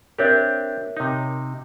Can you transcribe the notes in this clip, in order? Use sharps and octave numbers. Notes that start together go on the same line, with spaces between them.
C4 D4 G4 A#4 C#5 E5
C3 D#4